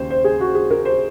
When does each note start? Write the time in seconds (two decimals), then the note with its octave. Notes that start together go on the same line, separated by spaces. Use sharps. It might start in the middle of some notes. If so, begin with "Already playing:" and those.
Already playing: D#2 C#3 C5
0.10 C5
0.24 G#4
0.40 F#4
0.55 G#4
0.71 A#4
0.85 C5